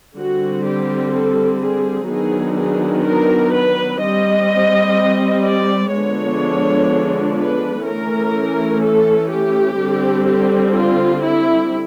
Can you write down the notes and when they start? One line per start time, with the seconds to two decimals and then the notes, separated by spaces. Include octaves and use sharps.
0.17 D3 G3 C4 F#4
0.66 G4
1.14 A4
1.61 G#4
2.10 D#3 F#3 B3 D4 G#4
2.58 G#4
3.06 A#4
3.53 B4
4.01 G3 C4 D#5
5.46 D5
5.94 D3 F3 G#3 B3 D4 C#5
7.37 B4
7.85 E3 A3 C#4 A#4
8.82 A4
9.30 G4
9.78 D3 G3 C4
10.27 G4
10.74 F4
11.23 E4